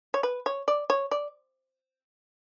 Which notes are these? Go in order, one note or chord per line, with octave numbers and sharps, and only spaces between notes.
C#5
B4
C#5
D5
C#5
D5